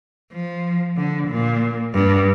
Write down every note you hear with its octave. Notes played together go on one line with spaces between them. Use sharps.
F3
D3
A#2
G2